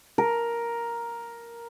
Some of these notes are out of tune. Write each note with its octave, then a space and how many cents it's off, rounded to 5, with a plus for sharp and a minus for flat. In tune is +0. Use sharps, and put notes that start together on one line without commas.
A#4 +5